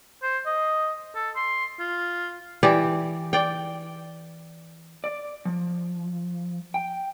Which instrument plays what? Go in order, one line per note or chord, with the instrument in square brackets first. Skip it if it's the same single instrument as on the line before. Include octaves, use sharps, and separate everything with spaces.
[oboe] C5
D#5
A4
C6
F4
[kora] E3 G4 D5
D5 G5
[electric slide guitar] D5
F3
G5